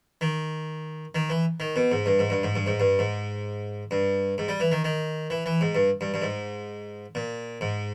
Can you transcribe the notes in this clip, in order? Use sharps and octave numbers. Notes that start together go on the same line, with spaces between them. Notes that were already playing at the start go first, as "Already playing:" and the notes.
D#3
D#3
E3
D#3
B2
G#2
G2
G#2
G2
G#2
G2
G#2
G2
G#2
G2
G#2
G3
E3
D#3
D#3
E3
E3
G#2
G2
G2
G2
G#2
A#2
G#2